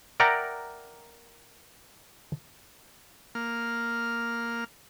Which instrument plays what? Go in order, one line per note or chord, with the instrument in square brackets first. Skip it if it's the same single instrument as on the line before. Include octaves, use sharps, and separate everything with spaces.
[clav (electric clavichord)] A#4 D5 E5 F#5 G5 A#5
[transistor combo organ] A#3 F6